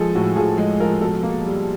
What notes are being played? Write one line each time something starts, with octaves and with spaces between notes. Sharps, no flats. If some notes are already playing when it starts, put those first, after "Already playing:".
Already playing: F3 G#3 G#4 A4
A2 F#4
F3 G#4
G#3
F3 A#4
B2 A4
A#3
G3